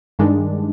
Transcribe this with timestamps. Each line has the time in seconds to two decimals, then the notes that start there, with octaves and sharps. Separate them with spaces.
0.19 G2 D#3 G#3 D4